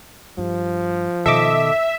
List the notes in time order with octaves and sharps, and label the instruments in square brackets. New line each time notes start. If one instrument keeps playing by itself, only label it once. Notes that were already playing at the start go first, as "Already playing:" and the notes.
[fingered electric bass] G2 [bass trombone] F3
[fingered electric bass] B2 D#3 [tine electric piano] A4 D#5 D6 [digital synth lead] E5